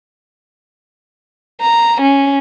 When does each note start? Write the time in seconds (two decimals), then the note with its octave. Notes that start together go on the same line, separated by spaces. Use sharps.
1.61 A#5
2.01 C#4